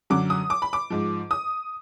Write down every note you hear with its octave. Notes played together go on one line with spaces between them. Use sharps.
F#2 D3 F#3 D6
D#6
D6
B5
D6
G#2 F3
D#6